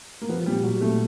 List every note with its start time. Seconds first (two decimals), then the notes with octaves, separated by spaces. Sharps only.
0.21 A#3
0.29 F3 B3
0.46 A#2 G3
0.63 F#3 G#3
0.81 A#2 A3